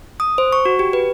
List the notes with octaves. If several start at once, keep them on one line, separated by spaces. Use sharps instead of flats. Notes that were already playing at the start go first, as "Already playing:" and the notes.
D#6
C5
C#6
F#4
G4
B4